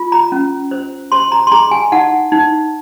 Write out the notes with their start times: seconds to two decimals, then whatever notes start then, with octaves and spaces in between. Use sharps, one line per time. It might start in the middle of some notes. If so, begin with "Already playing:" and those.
Already playing: F4
0.12 A#5
0.32 C#4
0.71 C5
1.12 C5 C6
1.32 A#5
1.47 C6
1.52 G#4 A#5
1.71 G#5
1.92 D#4 F#5
2.32 D#4